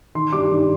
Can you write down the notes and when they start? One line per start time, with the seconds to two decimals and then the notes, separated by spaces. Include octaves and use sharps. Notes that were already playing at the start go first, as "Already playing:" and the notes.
0.15 D#3 C6
0.33 G3 D4 D6
0.51 D#3